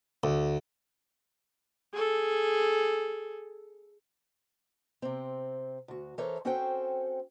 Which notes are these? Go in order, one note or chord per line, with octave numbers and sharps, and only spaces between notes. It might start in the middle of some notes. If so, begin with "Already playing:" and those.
D2
G#4 A4
C3 C4
D2 F#4
E3 A4 A#4 C5 C#5 E5
C4 C#4 F#4 A4 C5 G5